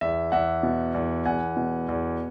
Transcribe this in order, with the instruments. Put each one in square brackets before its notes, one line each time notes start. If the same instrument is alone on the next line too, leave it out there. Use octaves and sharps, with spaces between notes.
[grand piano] E2 E5
E2 E5 F#5
B2
E2
E2 F#5 G#5
B2
E2